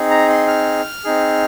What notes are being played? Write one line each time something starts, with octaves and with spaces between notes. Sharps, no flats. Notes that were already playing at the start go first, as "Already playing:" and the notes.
Already playing: C4 D#4 G#4
A#5
C6
F6
C4 D#4 G#4